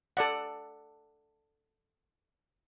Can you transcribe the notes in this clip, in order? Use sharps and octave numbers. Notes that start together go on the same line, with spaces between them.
A4 D5 F#5